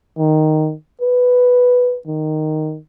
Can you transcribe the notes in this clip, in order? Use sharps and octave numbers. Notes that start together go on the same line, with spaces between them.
D#3
B4
D#3